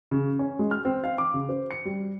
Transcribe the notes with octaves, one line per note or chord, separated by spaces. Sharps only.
C#3
C#4
G#3
F6
C4
F5
D6
C#3
C5
C#7
G3